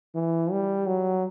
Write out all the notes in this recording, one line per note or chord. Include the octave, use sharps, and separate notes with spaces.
E3
G3
F#3